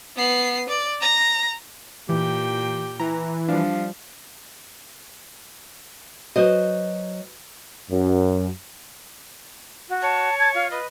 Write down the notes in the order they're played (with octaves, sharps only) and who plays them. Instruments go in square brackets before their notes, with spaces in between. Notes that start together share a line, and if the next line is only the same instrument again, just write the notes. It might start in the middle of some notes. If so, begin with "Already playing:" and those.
[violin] B3 C7
D5
A#5 A#6
[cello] A#2 G5 [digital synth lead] E3 [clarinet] G4
[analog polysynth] E3 [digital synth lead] A#5
[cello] F3 G3 [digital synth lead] D4 [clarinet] F5
[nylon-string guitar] F#3 C5 D#5 [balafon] F#4 B4
[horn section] F#2
[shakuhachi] F#4
[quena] C#5 [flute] A5
[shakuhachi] A5 [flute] G#6
[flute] F4 [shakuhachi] F5
[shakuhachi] B4 [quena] D#5